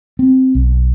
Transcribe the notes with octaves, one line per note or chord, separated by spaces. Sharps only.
C4
B1